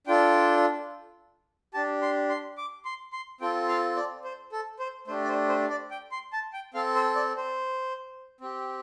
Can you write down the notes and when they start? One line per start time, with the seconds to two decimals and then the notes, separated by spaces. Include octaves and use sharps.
0.07 D4 F4 A4 G5
1.74 D4 G4 A5
2.02 C6
2.29 C6
2.57 D6
2.85 C6
3.13 C6
3.41 C4 F4 A4 G5
3.68 F5
3.96 D5
4.24 C5
4.52 A4
4.79 C5
5.07 A3 D4 G4 C5
5.24 D5
5.28 C5
5.49 C5
5.70 D5
5.91 G5
6.12 C6
6.33 A5
6.53 G5
6.74 C4 A4 F5
6.95 C5
7.15 D5
7.37 C5
8.41 C4 G4